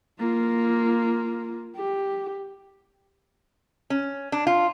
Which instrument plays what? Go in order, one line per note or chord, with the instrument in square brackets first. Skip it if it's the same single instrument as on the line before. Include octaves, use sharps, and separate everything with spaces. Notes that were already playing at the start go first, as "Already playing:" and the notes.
[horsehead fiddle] A#3 F4
G4
[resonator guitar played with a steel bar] C#4
D4
F4